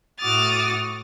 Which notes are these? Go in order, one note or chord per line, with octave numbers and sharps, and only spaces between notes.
A2 F#4 D6 D#6 F6 A6